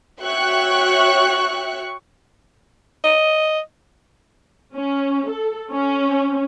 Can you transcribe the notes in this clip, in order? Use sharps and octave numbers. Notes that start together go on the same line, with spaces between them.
F#4 C#5 E5 G5 C#6 F#6
D#5
C#4
A4
C#4